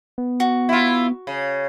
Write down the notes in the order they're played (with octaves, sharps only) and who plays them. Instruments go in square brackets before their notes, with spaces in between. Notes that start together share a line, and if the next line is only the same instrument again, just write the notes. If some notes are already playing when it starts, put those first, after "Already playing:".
[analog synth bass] B3
[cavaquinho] F#4
[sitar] E4 F4
C#3